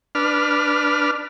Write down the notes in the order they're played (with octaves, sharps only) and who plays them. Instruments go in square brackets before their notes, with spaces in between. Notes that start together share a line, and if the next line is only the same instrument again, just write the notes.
[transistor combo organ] D4 B4 F6